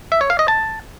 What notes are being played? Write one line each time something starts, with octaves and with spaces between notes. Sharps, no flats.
E5
C#5
F5
D#5
A5